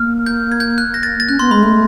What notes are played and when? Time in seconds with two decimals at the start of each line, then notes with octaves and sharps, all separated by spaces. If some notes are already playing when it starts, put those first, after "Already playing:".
Already playing: A#3 F6
0.26 G6
0.52 G#6
0.60 G6
0.78 F#6
0.94 A#6
1.03 A6
1.20 A6
1.29 C#4 F#6
1.39 B3 C6
1.51 G#3 B5
1.63 A3